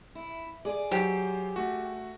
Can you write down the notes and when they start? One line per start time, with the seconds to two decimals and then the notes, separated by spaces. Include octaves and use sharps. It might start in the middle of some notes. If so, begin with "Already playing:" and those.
0.15 E4
0.65 G#4 D5
0.91 F#3 G4 C5
1.56 A3 F#4